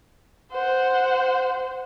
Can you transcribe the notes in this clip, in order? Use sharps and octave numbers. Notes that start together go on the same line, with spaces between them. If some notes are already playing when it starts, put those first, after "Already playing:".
C5 F#5